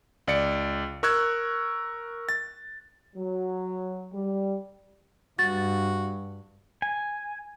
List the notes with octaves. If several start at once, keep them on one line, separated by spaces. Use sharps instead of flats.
C#2 D5 C#7
A#4 C#6 E6 F#6 G#6
A6
F#3
G3
G2 F#4 A6
G#5